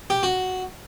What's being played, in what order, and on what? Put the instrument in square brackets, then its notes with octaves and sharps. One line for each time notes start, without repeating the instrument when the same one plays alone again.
[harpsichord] G4
F#4